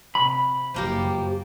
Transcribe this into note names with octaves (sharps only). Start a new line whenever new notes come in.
C3 B5
F#1 F3 A#3 G4
F#2